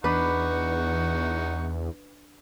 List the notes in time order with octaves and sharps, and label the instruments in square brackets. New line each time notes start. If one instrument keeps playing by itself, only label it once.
[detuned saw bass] E2 [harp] D4 B4 [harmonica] D#4 F#5 C#6